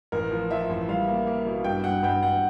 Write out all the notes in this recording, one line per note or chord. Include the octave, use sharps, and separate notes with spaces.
A1 A#4
F3
F3 E5
A1
G3 F5
A#3
A#3
B2
G2 G5
G2 F#5
G2 G5
G2 F#5